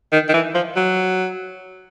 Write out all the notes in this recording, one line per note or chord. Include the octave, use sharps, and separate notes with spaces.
D#3
D#3
E3
F3
F#3